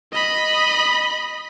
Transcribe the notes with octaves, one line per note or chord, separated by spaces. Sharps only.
D#5 B5